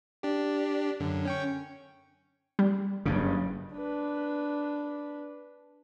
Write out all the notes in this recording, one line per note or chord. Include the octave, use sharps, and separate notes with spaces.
D4 G4
F#2 D3
C#4 G5 C#6
G3
F#1 G2 C#3
D4 B4